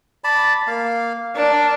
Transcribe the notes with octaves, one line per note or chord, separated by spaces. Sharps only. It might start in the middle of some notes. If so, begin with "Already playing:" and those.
D5 A5 B5
A#3 F5
D4 A#4